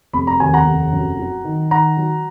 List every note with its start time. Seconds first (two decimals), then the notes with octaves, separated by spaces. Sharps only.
0.13 F1 B5
0.27 A#5
0.40 D#2 G#5
0.54 F#5 A#5
0.66 F1
0.92 F#2
1.19 F#3
1.44 D#3
1.71 D#3 F#5 A#5
1.97 F#3